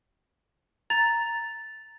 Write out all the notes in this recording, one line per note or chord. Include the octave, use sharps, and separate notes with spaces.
A#5 A6